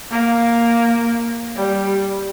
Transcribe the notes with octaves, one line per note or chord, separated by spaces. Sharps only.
A#3
G3